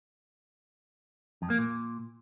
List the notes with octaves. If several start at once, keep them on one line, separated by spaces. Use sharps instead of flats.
F2
A#3
A#2